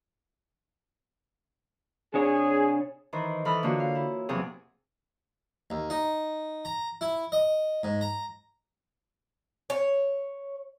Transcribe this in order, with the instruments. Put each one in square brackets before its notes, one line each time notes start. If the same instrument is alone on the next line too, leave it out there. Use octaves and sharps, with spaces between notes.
[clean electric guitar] C3 D4 C#5 [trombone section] G#4
[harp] D#3 E3 C5
E3 A4 B5 D#6 F6
D3 A#3 C#4 F4 F#4
F5
E4
E2 C3 F3 F#3 C4 G#4
[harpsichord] D#2
D#4
A#5
E4
D#5
G#2
A#5
[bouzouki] C#5